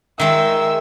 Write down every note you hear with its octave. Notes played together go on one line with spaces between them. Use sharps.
D#3 G#3 E5 E6